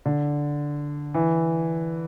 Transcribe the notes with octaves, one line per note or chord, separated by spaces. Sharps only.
D3
E3